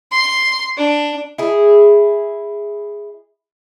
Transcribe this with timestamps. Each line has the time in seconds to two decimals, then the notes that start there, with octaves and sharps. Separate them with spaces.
0.11 C6
0.77 D4
1.38 E4 G#4